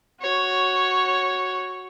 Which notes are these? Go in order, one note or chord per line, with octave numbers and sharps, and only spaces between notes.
F#4 C#5